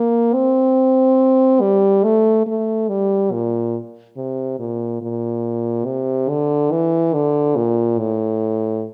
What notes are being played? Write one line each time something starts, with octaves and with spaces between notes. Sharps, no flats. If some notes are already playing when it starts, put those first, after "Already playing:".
Already playing: A#3
C4
G3
A3
A3
G3
A#2
C3
A#2
A#2
C3
D3
E3
D3
A#2
A2